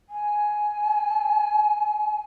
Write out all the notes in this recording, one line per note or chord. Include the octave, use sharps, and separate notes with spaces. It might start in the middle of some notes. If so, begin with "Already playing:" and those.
G#5